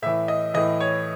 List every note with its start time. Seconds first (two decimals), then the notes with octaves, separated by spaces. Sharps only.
0.02 A2 E5
0.06 E3
0.28 D#5
0.54 A2 E3 D#5
0.80 C#5